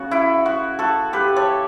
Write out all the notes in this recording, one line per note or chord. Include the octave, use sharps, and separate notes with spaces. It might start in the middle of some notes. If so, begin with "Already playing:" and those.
Already playing: C#3 B3 F#4
E4
F#4
F#4 A4
G4 B4
A4 C#5